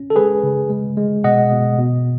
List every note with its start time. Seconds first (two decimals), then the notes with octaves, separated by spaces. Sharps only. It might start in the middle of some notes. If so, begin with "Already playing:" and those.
Already playing: C#4
0.10 A4
0.16 G#3 G#4 B4
0.43 C#3
0.70 G#3
0.97 G#3
1.24 B2 D#5 F#5
1.52 B2
1.79 B2